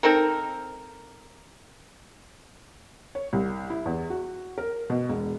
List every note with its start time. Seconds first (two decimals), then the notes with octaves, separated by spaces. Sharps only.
0.03 C4 D#4 A4 A#4
3.15 C#5
3.33 C2
3.70 E4
3.86 E2
4.10 F#4
4.58 A#4
4.90 B2
5.09 E1